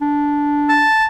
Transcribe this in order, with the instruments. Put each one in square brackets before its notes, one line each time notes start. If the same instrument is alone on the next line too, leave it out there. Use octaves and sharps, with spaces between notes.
[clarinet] D4
[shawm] A5